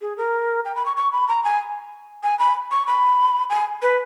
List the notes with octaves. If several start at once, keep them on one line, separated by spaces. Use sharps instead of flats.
G#4
A#4
G5
B5
C#6
C#6
B5
A#5
G#5
G#5
B5
C#6
B5
G#5
B4